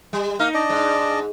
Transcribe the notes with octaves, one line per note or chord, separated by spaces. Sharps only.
G3
A#3 D#4 A#4 F5
D4 D5 D#5
G#2